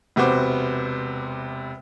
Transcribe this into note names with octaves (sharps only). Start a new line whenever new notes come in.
E1 C3 B3 F#4 C5 D6